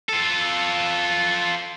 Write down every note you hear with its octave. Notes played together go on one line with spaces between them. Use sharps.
F4 A4